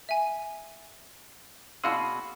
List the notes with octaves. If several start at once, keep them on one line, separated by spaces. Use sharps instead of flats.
E5 G#5
B2 F#4 G#4 F5 B5 C6 E6